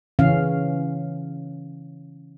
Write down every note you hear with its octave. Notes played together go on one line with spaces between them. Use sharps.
C#3 E3 C#4 F5